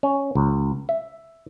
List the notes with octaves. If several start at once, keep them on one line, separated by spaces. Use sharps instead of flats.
C#4
C#2
E5